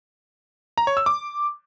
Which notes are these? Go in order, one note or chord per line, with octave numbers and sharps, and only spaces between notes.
A#5
C#5
E6
D6